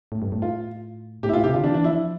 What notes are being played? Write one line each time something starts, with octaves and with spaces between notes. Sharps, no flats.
A2
G2
A2
F4
A2 G4
E4
A2 F4
C3 G4
D3 F4
E3 D4
D4
F3 E4